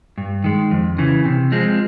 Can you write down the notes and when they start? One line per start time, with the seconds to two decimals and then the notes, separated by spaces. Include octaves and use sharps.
0.18 G2
0.44 D#3 G#3
0.71 F2
0.98 C#3 E3
1.25 C3
1.52 F3 G#3 C4